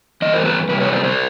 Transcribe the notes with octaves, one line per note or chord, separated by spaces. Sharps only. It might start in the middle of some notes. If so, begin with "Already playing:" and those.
G2 E3 D#5
A#4 C5
A4 B4
F2 C3 G3 B4
B4 C#5
C5 D5
C5 D5